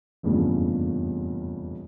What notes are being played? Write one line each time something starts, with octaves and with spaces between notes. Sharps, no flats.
F1 E2 G2 A#2 C#3